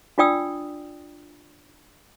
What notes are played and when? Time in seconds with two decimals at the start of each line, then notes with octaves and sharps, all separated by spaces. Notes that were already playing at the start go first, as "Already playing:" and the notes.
0.18 D4 F4 D5 G5 D#6 E6